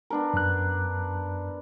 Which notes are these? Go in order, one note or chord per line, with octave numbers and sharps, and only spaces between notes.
B3 D4 A#4
F#2 F#6